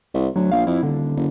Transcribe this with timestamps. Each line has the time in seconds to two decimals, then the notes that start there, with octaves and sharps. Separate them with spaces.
0.14 C2
0.36 D2 F#3
0.52 A#1 F5
0.67 F2 E4
0.83 D#1 D3
1.17 F#1